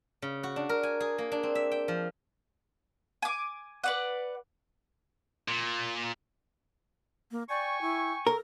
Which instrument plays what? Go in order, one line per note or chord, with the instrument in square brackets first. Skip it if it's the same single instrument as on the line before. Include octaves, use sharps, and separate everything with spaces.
[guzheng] C#3
F#4
D4
A#4
G#5
G#4
A#3
D4
C4
E5
G5
F3
[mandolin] G#5 D6
B4 D5 F#5
[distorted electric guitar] A#2
[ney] A#3
[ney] D5 [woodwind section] G5 G#5 C#6
[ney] E4
[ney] A4 [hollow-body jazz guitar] A#4